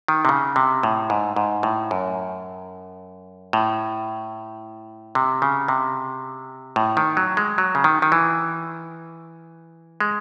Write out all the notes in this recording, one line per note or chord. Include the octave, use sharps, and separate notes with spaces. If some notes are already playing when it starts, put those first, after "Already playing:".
D#3
C3
C#3
C3
A2
G#2
G#2
A2
F#2
A2
C3
C#3
C3
A2
D#3
F#3
G#3
F#3
C#3
D#3
D#3
E3
G#3